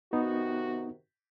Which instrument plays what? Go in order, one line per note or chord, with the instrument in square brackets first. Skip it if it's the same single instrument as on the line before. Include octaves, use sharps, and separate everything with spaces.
[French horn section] C3 D#3 F#4 [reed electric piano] B3 D#4